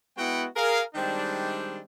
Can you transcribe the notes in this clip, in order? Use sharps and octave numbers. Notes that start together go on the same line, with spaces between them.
G#3 B3 E4 F#4 F#5 G5
G#4 A#4 F5
D#3 G3 G#3 C4 D4